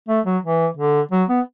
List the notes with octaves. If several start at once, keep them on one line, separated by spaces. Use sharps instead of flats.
A3
F#3
E3
D3
F#3
B3